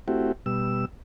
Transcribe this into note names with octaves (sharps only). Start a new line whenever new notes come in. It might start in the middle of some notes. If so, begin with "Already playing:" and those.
A3 C4 E4 F#4 G4
B2 G3 E6